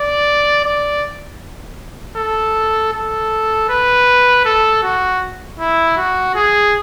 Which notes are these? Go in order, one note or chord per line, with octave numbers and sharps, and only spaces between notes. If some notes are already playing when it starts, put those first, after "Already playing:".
Already playing: D5
D5
A4
A4
B4
A4
F#4
E4
F#4
G#4